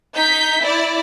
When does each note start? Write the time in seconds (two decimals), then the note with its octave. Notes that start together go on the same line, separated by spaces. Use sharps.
0.14 D#4 G6 B6
0.62 E4 D5